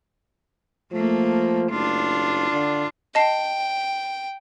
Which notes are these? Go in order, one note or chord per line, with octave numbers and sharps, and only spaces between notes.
F3 A3 A#3
F#1 D4 F4
D3
D#5 G5 A5 C7